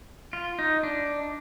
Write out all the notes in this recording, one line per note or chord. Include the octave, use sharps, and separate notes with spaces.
F4
D#4
D4